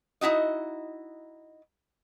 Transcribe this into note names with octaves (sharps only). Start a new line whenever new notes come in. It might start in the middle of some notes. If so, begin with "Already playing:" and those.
D#4 E4 F#4 D#5